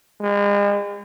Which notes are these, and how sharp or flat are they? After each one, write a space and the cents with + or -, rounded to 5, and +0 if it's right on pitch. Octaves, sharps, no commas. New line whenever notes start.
G#3 -40